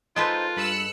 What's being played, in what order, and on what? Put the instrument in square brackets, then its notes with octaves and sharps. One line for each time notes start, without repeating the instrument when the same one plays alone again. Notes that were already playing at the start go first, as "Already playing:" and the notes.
[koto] G#3 A4 B4 [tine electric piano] D#4 C5 [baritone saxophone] F4
[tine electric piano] G2 B5 [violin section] E6 F#6 C#7